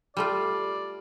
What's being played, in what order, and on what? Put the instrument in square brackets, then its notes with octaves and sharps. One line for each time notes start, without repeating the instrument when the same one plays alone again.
[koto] G3 A3 F4 [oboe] D5